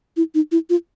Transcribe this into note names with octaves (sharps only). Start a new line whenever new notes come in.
E4
D#4
E4
F4